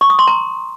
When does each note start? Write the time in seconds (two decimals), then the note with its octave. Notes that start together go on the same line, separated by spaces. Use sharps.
0.01 C#6
0.10 D#6
0.19 C6
0.27 A#5